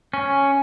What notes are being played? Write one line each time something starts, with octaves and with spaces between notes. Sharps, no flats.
C#4